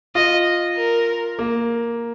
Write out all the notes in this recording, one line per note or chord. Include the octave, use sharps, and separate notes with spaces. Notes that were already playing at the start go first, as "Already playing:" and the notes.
F4 D#5
A#4
A#3